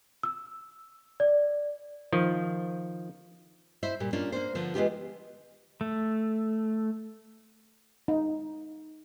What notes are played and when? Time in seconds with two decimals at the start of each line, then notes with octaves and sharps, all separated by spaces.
0.23 E6
1.20 D5
2.13 D#3 F3
3.83 E4 C5 E5
4.00 A#2 G3
4.13 A#3 C#4 D4 F4
4.32 A#3 D4 C5
4.55 D3 F3 B3
4.75 E3 G3 G#3 B3 F4 G4
5.81 A3
8.08 D#4